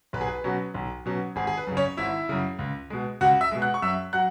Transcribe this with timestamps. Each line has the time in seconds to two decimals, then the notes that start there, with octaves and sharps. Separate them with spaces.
0.13 B1 B4
0.21 G#4
0.28 B4
0.44 B2 F#3 C#4
0.74 B1
1.06 B2 F#3 C#4
1.36 G#1 G#4
1.47 G#4
1.57 B4
1.67 F#2 C#3
1.77 C#4 C#5
1.97 G#1 E4 E5
2.29 F#2 C#3
2.59 C#2
2.90 B2 G#3
3.21 C#2 F#4 F#5
3.41 E5 E6
3.51 B2 G#3
3.62 F#5 F#6
3.74 C#6
3.82 F#2 E5 E6
4.13 F#3 F#5 F#6